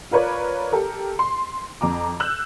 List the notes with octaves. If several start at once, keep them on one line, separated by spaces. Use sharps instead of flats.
F4 A#4 B4 C#5 D5
G4 A4 A#4
C6
F2 A#5 D6
E6 F#6 G6